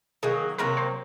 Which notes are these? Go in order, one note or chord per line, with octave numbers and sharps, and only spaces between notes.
D#3 F#3 A#3 G#4
C3 F#3 A#3 A#4
C5